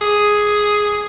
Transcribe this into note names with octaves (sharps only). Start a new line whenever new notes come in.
G#4